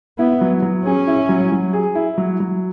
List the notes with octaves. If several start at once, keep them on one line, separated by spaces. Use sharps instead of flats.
B3 E4
F#3
F#3
C#4 G#4
E4
F#3
F#3
G#4
E4
F#3
F#3